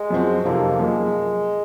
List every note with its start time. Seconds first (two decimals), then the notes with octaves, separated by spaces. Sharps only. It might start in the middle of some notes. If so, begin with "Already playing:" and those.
Already playing: G#3
0.10 F#2 F3 C4 F#4
0.45 F2 C3 F3 A#3 C4 D#4
0.79 F#2 F3 G#3 A#3